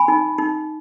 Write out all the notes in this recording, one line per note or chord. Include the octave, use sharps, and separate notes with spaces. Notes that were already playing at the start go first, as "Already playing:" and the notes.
Already playing: G#5 B5
D#4
D#4